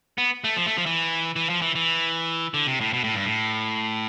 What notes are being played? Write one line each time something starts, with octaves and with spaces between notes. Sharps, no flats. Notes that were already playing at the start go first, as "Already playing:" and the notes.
B3
A3
F3
A3
F3
E3
E3
F3
E3
E3
D3
C3
A2
B2
A2
G2
A2